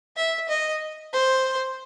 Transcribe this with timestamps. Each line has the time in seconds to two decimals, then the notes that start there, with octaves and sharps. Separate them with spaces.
0.16 E5
0.49 D#5
1.13 C5